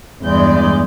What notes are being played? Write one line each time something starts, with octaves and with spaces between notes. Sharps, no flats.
E2 G2 G#3 D5 G6